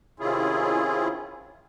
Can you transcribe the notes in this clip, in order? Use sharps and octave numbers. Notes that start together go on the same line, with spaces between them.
C3 D#3 C#4 E4 F4 G#4